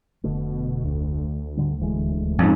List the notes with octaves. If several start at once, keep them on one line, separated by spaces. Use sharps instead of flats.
F1 B2 D3 A3
D2
G#2 D3 G3
D#1 E3 G#3
F2 G#2 C#4